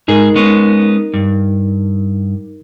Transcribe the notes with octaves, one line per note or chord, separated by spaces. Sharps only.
G#2 D#4 G#4 A#4
G#3 B3 C#4
G2